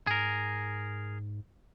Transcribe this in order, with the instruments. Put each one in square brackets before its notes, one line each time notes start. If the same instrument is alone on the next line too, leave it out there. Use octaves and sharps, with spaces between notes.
[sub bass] G#2 [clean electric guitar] G#4 A#4